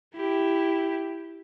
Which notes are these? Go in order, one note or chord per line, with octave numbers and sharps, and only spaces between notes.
E4 G4